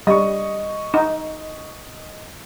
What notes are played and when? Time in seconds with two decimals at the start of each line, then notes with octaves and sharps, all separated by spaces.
0.07 G3 D#5 C#6
0.94 D#4